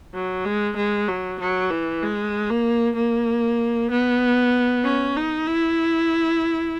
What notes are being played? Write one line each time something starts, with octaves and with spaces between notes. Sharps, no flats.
F#3
G#3
G#3
F#3
F#3
E3
G#3
A#3
A#3
B3
C#4
D#4
E4